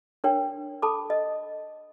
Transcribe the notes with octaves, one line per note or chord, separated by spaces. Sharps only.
D4 A#4 C#5 G5
A4 A5 B5 D6
D#5